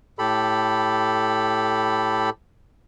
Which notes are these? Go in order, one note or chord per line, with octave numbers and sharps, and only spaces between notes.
A2 G4 A4 B5